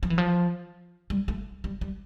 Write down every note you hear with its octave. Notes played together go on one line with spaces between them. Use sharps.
F3
E3
F3
G3
A3
G3
G3